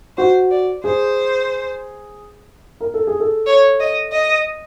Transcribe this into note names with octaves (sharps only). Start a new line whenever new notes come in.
F#4 C5
D5
G#4 C5
A#4
A4
G#4
A4
C#5
D#5
D#5